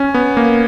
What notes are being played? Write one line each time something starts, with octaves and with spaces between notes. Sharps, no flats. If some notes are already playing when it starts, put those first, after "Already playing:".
Already playing: C#4
B3
A#3